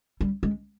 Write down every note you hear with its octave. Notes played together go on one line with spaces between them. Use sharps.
G3
G#3